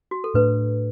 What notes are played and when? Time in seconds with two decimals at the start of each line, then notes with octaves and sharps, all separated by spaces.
0.11 F#4
0.24 A4
0.34 A2 A3 D4 B4